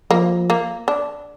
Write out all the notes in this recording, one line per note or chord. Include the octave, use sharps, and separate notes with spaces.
F3 A#3
A#3
D4